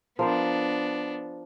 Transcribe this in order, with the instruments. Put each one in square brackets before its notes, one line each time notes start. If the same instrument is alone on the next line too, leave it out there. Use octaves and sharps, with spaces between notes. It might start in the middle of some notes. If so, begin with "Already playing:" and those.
[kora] F3 A#4 C5 [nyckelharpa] B3 D4